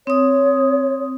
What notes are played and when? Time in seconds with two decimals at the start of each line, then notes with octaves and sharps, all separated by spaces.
0.07 C4 C#5 D#6